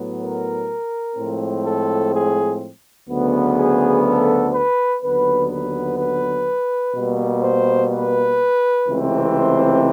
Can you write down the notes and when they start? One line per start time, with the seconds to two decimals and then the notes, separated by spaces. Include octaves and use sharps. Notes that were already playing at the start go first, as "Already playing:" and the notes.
Already playing: A2 F#3 B3
0.19 A#4
1.16 A2 F3 G#3 C4
1.65 A4
2.13 G#4
3.09 D2 C#3 F#3 B3
3.57 G#4
4.06 A4
4.54 B4
5.02 D#2 D3 F#3 B3 B4
5.51 B4
5.98 B4
6.95 B2 G3 A#3
7.43 C5
7.92 B4
8.88 C#2 C3 E3 A3 C4
9.36 C5